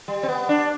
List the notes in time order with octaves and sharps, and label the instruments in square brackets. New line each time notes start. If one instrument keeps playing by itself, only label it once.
[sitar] G3
C4
B3
D4